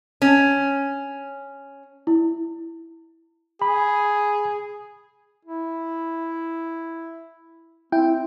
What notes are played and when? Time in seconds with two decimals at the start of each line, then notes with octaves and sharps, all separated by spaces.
0.22 C#4
2.07 E4
3.62 G#4 B5
5.45 E4
7.92 C4 E4 G5